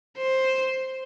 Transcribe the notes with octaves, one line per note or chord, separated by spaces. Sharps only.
C5